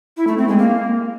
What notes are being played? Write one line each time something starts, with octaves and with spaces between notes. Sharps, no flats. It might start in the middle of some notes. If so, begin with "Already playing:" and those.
E4
A3
C4
G#3
A#3